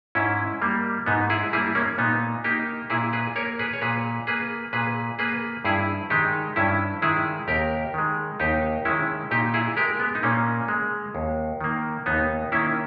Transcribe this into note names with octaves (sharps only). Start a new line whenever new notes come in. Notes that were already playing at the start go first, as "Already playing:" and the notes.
G#2 C#4 E4
G3 A#3
G#2 B3 D#4
E4 G#4
G3 A#3 E4 G#4
A#3 C#4
A#2 B3 D#4
A#3 D#4 G4
A#2 E4 G#4
G#4 B4
A#3 A#4 C#5
G#4 B4
C#5
A#2 G#4 B4
A#3 G#4 B4
A#2 G#4 B4
A#3 G#4 B4
G2 E4 G#4
D#3 G#3 D#4 G4
G2 C#4 E4
D#3 G#3 E4 G#4
D#2 G4 A#4
D#3 G#3
D#2 D#4 G4
D#3 G#3 C#4 E4
A#2 D#4 G4
E4 G#4
G#3 G4 A#4
B3
D#4
A#2 A#3 C#4
G#3
D#2
D#3 A#3
D#2 B3 D#4
D#3 A#3 C#4 E4